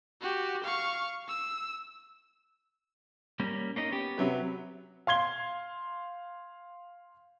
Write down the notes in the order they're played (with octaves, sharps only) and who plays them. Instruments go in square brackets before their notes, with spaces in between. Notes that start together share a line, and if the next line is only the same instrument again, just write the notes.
[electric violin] F#4 G4
F5 C#6
E6
[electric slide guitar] G3 A#3 C#4
A#3 C#4 D#4
B3 C#4 G4
[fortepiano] C3 F#3 B4
[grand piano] F5 C6 G#6 G7